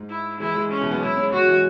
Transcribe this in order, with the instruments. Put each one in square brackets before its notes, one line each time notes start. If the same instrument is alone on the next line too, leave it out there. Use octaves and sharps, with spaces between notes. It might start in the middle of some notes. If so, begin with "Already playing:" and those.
Already playing: [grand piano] G#2
[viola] E4
[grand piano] E3 G#3 [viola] E4
[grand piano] E3 G#3
[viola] C#4
[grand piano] B2 E3
F#3 B3
[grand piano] G#3 C#4 [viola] E4
[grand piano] G#3 C#4
[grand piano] G#3 C#4 [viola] F#4
[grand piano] E3 G#3